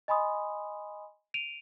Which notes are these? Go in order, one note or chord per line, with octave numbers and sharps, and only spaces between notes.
D#5 G#5 B5 C6 D#6
D7 D#7 F7